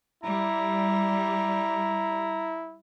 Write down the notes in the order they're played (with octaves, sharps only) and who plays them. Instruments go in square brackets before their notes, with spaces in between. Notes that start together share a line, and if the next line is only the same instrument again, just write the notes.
[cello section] G3 [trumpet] E4 [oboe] A#5